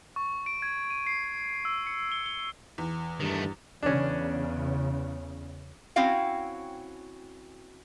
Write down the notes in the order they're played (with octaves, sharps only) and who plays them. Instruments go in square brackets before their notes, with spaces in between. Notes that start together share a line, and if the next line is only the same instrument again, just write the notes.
[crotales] C#6
D7
G#6
D#7
C7
E6
C#7
G7
G7
[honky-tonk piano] E2
[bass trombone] G2 [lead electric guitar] D#3 A3
[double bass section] E2 C#3 [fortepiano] C#4 D4
[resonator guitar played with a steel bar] C4 C#4 E4 F#4 F5 G5